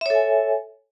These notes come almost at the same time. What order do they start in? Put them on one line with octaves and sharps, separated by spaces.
E5 C#5 A4 G#5